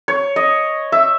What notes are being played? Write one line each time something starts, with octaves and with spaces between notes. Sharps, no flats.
C#5
D#5
E5